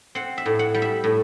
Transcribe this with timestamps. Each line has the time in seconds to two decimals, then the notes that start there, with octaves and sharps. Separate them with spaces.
0.15 C4 F#5
0.38 E5
0.46 A2
0.59 F#5
0.74 G3
0.82 E5
1.04 A2